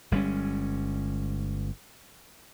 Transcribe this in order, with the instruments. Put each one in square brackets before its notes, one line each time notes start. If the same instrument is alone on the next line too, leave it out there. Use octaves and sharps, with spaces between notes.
[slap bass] G1 G3 G#3 C#4